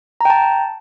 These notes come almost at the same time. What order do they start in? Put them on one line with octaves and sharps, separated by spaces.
A#5 G5 A5